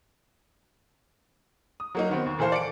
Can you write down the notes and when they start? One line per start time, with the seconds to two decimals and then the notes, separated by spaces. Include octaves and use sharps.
1.80 D#6
1.95 F#3 A#3 D#4
2.09 D#3 B3 C4
2.26 D#2
2.39 A#2 E3 A4 C5 F5
2.52 D5 C#7 D7